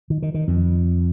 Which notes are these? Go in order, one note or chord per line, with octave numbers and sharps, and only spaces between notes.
D#3
D#3
D#3
F2